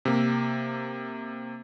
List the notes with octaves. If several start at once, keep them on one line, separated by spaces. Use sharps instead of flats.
C3 A#3